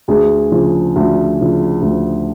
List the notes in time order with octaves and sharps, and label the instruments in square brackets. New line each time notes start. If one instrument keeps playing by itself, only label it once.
[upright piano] D2 G#4
C#3 F3
D2
C#3 F3
D2